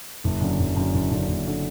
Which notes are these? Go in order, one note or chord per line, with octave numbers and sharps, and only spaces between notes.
F#1
F#2 D3
F#1
F#2 D3
F#1
F#2 D3
F#1
D3